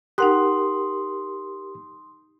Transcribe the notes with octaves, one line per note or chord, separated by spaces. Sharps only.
D#4 G4 A#4 F#5 C6 D#6 F#6